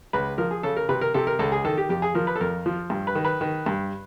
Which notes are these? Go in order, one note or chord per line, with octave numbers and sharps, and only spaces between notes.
C#2 B4
F3 A#4
G#4
C#3 A4
A#4
C3 B4
A#4
C3 A4
A#4
C#2 A4
G#4
D#3 A4
G4
F2 G4
G#4
F3 A#4
B4
A4
F2 A#4
F3
G2
B4
D#3
B4
D#3
G2